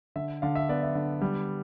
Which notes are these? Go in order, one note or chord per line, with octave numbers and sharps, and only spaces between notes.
D3 E5
D3 F5
E5
B3 D5
E5
D3
G3